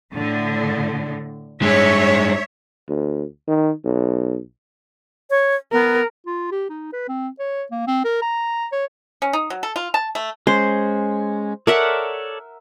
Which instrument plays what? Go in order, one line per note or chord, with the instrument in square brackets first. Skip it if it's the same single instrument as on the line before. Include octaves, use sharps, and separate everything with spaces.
[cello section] A2 D3
[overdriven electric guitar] G2 G#3 [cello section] C#5 E5
[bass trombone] D2
D#3
B1
[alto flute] C#5
[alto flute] B3 [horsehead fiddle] A#4
[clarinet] F4
G4
D#4
B4
C4
C#5
A#3
C4
A#4
A#5
C#5
[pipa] C#4
D#4
F#3
A4
F4
A5
A3
[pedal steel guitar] G#3 C#4 [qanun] C5
[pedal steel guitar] A4 C#5 D5 [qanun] A#4 E5 F#5